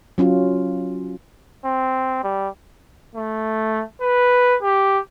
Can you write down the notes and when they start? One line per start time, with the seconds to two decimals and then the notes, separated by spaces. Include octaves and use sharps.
0.18 F#3 C#4 F4
1.64 C4
2.23 G3
3.15 A3
4.01 B4
4.62 G4